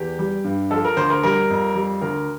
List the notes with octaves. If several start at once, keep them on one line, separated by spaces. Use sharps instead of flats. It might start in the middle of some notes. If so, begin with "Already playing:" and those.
Already playing: E2 G4
G3
G2
F3 A4
A#4
D2 C5
A#4
G3 A#4
F2
G3
D2 A#4